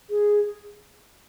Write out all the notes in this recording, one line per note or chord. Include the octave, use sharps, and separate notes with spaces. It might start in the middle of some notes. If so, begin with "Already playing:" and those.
G#4